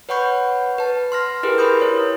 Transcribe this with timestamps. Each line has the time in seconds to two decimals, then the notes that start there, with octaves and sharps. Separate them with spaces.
0.09 B4 C#5 F#5 B5 C#6 G6
0.78 B4 A5
1.12 C6 F6 A#6
1.43 E4 G4 G#4 A#4 B4
1.58 A#4 B4 B5 C6 D#6 G6
1.82 E4 C#5